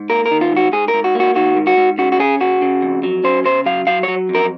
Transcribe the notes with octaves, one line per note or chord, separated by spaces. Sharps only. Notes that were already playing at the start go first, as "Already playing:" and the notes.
Already playing: G#2
A#3 A#4
A#4
D#3
F4
G#2
F#4
G#2 G#4
A#4
G#2
F#4
A#3 F#4
D#3 F#4
G#2
F#4
G#2
C#3 F#4
F#4
C#4 G#4
C#3 F#4
C#3
F2
F#3
C#4 C5
C#3 C5
F#3 F5
F#3 F5
F#3 C#5
F2
A#4